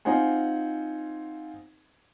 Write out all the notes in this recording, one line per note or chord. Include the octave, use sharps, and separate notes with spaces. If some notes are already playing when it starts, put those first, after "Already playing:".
C4 D#4 F4 C5 F#5 G#5